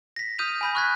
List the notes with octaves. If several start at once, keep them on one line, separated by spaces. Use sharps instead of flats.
A#6 B6
D#6 F6 G6 D#7 F7
G#5 B5 G6
C#6 F6 F#6 G#6 B6